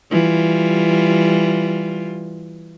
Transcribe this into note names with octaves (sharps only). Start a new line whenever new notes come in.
E3 G3 F4